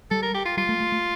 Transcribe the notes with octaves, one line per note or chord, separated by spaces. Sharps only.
G3 A4
A#4
G4
F4
G3 F4
A3
A3
A3